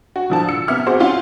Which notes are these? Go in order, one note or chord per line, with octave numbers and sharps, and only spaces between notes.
F#4
D3 F3 A5
E6 C#7
C3 B3 E5 F6
F#4 G#4 C5 C6 D6
C4 C#4 F4 F#5